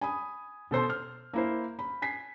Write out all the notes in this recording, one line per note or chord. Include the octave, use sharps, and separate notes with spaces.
G#5 B5 D#6
B2 A4 C5 C6
F6
A#3 E4 C5
B5
G#5 B6 C7